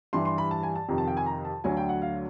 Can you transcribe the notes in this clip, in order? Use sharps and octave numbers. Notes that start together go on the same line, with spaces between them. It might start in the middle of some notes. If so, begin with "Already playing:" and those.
G2 E3 G3 C6
C6
B5
A5
G#5
A5
F2 C3 D#3 A#5
A5
G5
G#5
A#5
A5
D2 D3 F#3 G#5
G5
F#5
F5